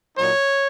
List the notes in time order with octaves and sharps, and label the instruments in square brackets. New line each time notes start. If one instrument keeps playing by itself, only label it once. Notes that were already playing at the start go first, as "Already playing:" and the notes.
[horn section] A#2 F#3 D#4 C#5